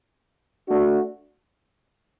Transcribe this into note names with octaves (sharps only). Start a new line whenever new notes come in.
A3 D4 F#4